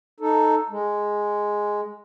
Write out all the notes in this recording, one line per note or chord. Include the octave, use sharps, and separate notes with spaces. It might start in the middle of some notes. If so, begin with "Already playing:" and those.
D#4 A4
G#3